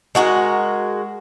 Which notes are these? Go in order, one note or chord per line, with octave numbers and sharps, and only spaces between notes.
G#3 F#4 G#4 A#4